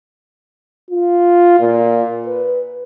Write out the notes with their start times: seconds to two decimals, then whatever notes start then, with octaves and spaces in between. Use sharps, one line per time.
0.90 F4
1.60 A#2
2.27 B4